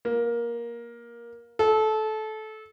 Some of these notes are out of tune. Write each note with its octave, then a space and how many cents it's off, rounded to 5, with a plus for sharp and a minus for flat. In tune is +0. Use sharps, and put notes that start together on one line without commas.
A#3 +15
A4 -20